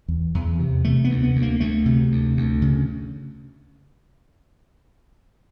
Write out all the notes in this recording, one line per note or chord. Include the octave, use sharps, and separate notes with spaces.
E2
E2
C3
C3 A3
B3
D2
B3
D2
A#3
D2 A3
C3
D2
D2
C#3